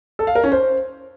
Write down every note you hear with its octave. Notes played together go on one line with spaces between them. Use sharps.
A4
F5
A#4
C#4
C5